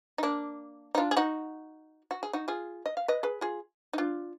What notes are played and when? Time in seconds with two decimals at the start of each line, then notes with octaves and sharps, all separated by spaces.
0.18 D#4
0.23 A#3 D4
0.95 D#4
0.97 D4 F4
1.11 G#4
1.17 D#4 F#4
2.11 F#4
2.23 G#4
2.33 D#4 F#4
2.48 F4 G#4
2.86 D#5
2.97 F5
3.08 B4 D#5
3.23 G#4 B4
3.41 F4 G#4
3.93 D#4
3.98 D4 F4